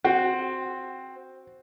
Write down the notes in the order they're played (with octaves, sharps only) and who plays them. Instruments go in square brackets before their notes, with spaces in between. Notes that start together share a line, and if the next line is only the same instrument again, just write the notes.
[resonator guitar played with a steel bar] C4 [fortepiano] F#4